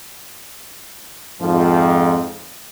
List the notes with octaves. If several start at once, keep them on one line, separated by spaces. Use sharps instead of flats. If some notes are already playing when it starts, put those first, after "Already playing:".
F2 G#2 F3